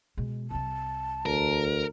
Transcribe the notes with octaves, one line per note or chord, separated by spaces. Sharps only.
B2 G#3
C2 G3 A5
D2 A#4